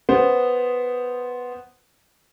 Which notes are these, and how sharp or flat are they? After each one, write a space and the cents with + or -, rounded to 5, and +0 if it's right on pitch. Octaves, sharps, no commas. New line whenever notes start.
B3 +0 C5 +0